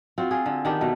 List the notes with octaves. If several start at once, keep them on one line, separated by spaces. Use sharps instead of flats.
C4 F4 F#4
F4 G#4
D3
D#3 B3 D4 G4
B2 A3